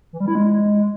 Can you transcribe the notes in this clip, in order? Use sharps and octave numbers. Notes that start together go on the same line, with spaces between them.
E3
G3
E4
G#3